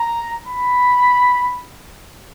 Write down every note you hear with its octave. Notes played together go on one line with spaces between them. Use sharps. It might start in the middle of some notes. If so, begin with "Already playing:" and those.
Already playing: A#5
B5